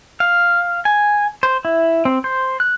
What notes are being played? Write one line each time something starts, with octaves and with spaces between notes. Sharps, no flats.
F5
G#5
C5
E4
C4
C5
F#6